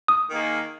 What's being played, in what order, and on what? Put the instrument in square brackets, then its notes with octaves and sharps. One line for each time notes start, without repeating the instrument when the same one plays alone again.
[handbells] D#6
[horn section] D#3 A#3 G#4